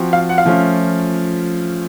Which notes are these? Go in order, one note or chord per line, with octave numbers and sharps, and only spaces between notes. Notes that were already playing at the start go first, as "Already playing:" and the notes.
Already playing: F3 C4 F#4
F5
F#5
F5
F3 A3 C#4 F4